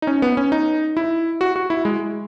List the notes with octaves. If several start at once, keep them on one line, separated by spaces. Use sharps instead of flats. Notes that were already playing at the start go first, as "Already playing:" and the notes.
D#4
C#4
B3
C#4
D#4
E4
F#4
F#4
E4
G#3